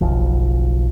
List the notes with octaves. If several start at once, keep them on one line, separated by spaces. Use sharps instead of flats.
F#1 B1 F3